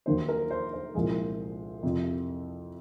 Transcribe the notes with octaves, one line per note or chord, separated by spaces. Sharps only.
D#2 D#3 F#3 A#3 C5
A#4
C5
C5
C2 A#2 F3 G#3
F2 C3 F3